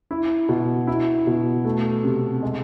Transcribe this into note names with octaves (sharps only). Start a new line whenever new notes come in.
E4
B2
E4
B2
A3
C3
G#3